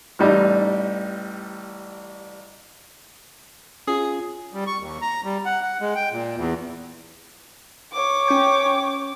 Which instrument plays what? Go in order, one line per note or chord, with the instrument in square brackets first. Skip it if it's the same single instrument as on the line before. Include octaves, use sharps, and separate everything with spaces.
[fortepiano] A1 G3 D#4
[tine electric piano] C#4 F4 [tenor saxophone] G#4
[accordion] G3
C#6
D#2
A#5
G3
F#5
F#5
G#3
G5
A#2
E2
[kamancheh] C#5 D6
[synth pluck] C#4 G5